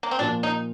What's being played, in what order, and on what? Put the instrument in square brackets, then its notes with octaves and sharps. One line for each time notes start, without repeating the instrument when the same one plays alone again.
[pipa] A#3
C4
[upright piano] A#2 F3 A#3 [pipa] D4
[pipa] D#4